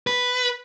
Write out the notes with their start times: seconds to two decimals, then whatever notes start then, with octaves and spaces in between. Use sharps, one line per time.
0.07 B4